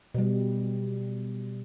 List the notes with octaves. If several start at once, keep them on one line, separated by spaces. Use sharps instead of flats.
B2 G3